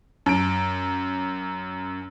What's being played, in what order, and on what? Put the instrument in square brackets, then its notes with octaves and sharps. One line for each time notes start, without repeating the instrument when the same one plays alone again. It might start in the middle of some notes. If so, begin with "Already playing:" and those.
[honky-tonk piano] F#2 D7